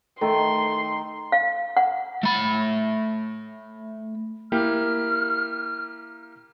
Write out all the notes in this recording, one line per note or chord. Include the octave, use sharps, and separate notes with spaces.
D#3 A3 C6
F5
F#5
A3 B5
A#3 E4 G4 F6